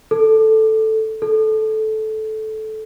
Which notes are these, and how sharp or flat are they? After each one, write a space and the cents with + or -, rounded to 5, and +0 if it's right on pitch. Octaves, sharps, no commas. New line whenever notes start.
A4 +0
A4 -15